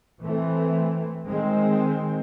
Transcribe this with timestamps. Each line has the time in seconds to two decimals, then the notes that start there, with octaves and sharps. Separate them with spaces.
0.22 E3 A3 C4
1.27 D#3 G#3 C4